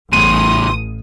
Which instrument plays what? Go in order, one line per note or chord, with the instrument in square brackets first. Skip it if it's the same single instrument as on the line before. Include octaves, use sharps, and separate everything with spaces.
[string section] A1 D#6 [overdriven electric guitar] E2 A2 [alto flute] C6 [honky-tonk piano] D#7